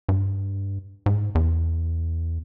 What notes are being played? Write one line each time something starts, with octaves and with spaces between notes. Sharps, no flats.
G2
G#2
E2